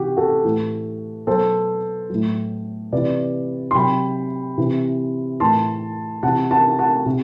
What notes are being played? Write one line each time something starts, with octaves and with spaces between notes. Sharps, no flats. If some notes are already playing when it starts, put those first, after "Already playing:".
Already playing: C3 E3 F#4 G4
F#4 A4
A2 E3
B2 F#3 A4 C5
A2 F#3
C3 E3 B4 D5
C6
C3 F#3 G5 B5
C3 E3
A2 E3 A5 C6
C3 E3 F#5 A5
F#5 A5
F#5 A5
C3